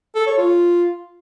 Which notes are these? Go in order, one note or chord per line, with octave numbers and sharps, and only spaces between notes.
A4
C#5
F4